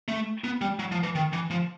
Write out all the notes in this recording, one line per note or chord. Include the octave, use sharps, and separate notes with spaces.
A3
B3
G3
F#3
F3
E3
D#3
E3
F3